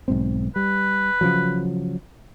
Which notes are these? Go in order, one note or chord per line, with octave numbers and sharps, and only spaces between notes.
B1 G#2 C4
G3 B4
C#3 F3 F#3